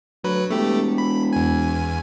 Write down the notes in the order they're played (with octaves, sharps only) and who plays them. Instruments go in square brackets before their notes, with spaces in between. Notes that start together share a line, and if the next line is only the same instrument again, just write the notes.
[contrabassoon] D2 [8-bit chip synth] F#3 B4
[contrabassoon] E1 [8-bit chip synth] A3 G4
[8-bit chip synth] B5
E2 G#5